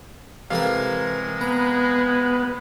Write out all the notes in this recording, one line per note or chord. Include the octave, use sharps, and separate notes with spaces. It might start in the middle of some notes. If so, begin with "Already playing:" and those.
C3 E3 G#3 A3 A#4 F5
B3 A#5